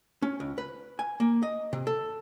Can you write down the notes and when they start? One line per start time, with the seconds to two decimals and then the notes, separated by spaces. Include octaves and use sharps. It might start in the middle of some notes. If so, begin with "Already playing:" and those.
0.22 C#4
0.40 C#2
0.58 B4
0.99 G#5
1.20 A#3
1.43 D#5
1.73 C3
1.87 A4